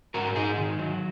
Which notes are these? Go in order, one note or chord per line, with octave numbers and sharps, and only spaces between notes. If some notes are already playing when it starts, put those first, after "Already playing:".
G#2 F#4 A#4
G#2 D#4 G#4
D#3
F#3